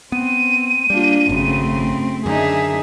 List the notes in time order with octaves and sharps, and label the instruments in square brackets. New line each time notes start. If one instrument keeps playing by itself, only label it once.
[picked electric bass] B3 [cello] C4 [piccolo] D#7
[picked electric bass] G3 [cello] A#3 [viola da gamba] D4 F4
[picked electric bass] G#1 [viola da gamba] F#2 C#3 [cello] A3 C4
[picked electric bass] F#2 D3 [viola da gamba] D4 D#4 [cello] G#4 E5